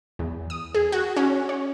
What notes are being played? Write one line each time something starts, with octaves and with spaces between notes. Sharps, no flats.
E2
D#6
G#4
F#4
C#4
C#5